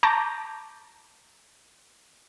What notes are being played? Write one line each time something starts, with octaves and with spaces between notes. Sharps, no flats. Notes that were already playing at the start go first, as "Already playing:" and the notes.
A5 A#5 C#6 D6 G6 A#6